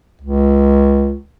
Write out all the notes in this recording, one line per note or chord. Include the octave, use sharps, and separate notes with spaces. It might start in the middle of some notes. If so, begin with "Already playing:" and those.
C#2